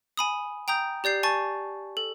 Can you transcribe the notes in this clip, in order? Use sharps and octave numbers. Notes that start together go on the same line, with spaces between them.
G#5 B5 D#6
G5 A#5 D#6 G6
G4 D5 G6 C7
G#5 A5 C#6 A6
A4